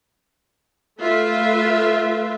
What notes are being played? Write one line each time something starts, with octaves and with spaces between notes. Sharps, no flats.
A3 F4 B4 E5